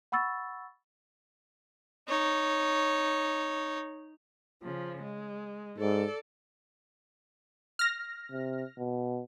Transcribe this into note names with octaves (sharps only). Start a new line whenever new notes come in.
F#5 B5 C#6 E6 A6
D#4 C#5
C#3 F3
G#3
G#2 A4 D5
F6 A#6
C3
B2